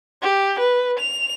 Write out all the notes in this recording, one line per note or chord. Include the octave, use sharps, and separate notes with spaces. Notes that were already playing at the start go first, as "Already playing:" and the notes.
G4
B4
F7